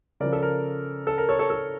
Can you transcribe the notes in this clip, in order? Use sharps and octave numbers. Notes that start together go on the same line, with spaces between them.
C#3 F3 A#4 D5
A4
A#4
A4
A#4
A4 C#5
A4 C#5
A4